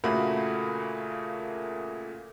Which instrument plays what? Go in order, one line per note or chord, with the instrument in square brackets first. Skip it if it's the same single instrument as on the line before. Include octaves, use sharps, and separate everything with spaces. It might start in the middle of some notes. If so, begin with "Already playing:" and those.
[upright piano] A#2 C#3 A3 A#3 F#4 B5